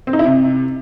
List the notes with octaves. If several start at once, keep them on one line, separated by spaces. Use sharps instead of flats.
C4
D#4
E4
C3